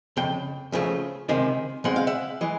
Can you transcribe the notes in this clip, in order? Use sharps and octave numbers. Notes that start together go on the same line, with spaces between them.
F2 C#3 G5
C#2 C#3 F3 A3
C#2 C3 D#3 G#3
B2 G#3 C4 F#5
F5
E5 F#5
E3 G#3